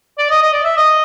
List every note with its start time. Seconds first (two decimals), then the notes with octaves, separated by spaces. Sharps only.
0.18 D5
0.30 D#5
0.42 D#5
0.53 D5
0.64 E5
0.77 D#5